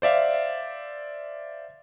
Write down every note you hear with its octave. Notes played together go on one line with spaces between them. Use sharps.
C5 D5 E5 F5